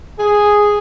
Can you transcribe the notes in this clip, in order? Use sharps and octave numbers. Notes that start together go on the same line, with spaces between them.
G#4